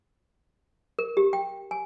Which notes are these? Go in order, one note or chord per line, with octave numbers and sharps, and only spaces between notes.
A#4
G4
G5
G#5